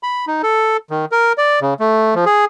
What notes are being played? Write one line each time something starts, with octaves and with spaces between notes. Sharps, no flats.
B5
D#4
A4
D#3
A#4
D5
C#3
A3
F3
G#4